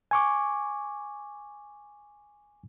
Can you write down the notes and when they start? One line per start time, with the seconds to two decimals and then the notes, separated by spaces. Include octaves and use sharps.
0.11 G#5 C#6 D6